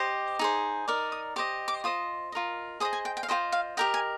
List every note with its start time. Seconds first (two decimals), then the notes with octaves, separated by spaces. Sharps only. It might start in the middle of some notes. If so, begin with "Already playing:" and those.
Already playing: G4 C5 D#5
0.39 D#4 G#4 C5
0.88 D#4 A#4 D5
1.12 D#6
1.36 G4 C5 D#5 D6
1.68 D6
1.84 F4 C5 D#5 D#6
2.32 F4 A#4 D#5
2.80 G#4 C5 D#5 D#6
2.93 G#5
3.05 G5
3.17 G5
3.23 F5
3.28 F4 G#4 C5 D#5 G5
3.52 F5
3.77 G4 A#4 D#5 G5
3.94 G#5